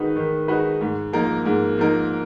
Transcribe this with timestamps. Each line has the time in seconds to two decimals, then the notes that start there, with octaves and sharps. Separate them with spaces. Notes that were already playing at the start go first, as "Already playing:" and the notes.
Already playing: D#3 G#3 D#4 F#4 B4
0.16 D#3
0.48 G#3 D#4 F#4 B4
0.81 G#2
1.13 F3 A#3 D#4 A#4
1.45 G#2
1.78 F3 A#3 D#4 A#4